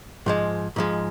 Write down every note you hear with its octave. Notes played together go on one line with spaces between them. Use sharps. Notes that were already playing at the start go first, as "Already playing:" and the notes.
G#2 F3 G#3
G#2 F3 G#3